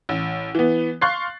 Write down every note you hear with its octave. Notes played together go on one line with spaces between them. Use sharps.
A1
E3 B3
F5 C6 C#6 F#6 A6 C7